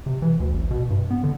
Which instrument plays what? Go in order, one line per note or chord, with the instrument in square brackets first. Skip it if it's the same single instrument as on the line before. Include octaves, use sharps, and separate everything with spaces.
[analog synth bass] C3
E3
D2
A1
B2
G2
B3
D3